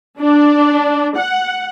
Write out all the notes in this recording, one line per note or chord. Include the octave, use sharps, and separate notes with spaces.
D4
F#5